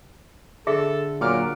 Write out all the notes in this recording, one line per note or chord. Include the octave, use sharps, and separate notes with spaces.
D3 G#4 A4 E5
A#2 F#3 F#5 D6 F6